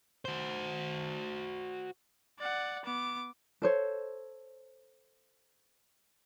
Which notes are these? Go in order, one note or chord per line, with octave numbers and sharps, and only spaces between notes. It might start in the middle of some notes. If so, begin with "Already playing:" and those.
F#4 C5
D5 F#5
B3 D6
A4 C5 C#5